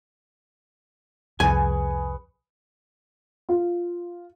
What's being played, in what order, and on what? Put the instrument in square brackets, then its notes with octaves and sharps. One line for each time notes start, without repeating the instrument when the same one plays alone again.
[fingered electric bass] C2 F2 [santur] G#4 B4 C#6 [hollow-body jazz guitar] G#5
[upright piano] F4